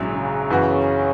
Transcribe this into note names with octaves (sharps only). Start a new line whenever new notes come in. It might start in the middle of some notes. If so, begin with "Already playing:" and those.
Already playing: A#1 G#2 F#3 C#4 E4
C#3
F#2 E3 B3 F#4